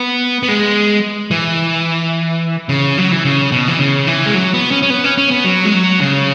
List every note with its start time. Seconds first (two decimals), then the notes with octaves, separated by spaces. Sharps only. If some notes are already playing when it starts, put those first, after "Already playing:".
Already playing: B3
0.43 B3
0.49 G#3
1.31 E3
2.69 C#3
2.98 F#3
3.12 E3
3.25 C#3
3.52 B2
3.68 E3
3.79 C#3
4.07 E3
4.26 G#3
4.34 F#3
4.54 B3
4.71 C#4
4.82 C#4
4.90 B3
5.04 C#4
5.18 C#4
5.31 B3
5.45 F#3
5.65 G#3
5.74 F#3
6.01 C#3